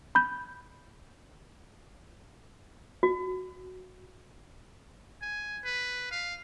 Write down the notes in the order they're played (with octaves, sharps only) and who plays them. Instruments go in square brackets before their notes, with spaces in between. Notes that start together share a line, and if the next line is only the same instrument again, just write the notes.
[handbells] B5 G6
[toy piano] F#4
[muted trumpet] G#5
B4
F5